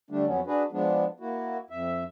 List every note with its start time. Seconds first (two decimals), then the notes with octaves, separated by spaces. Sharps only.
0.11 D3 G3 A3 D4
0.26 F2 F#3 B3 C#4
0.47 D4 F#4 G#4 B4
0.72 F3 G#3 B3 D4
1.20 A#3 E4 F#4
1.70 F2 E5